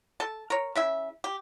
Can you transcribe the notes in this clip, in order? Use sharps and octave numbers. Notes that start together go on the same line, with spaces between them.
A4 A5
A#4 C#5
C#3 E4 E5
G4